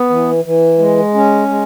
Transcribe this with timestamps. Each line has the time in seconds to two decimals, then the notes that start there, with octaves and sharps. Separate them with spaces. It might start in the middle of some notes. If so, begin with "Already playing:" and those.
Already playing: B3
0.10 E3
0.44 E3
0.79 G#3
1.14 C#4
1.48 G#3